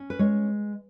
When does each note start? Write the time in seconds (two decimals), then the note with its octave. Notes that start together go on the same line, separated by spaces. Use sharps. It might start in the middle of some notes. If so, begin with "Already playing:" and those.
Already playing: C#4
0.10 B4
0.19 G#3 C#5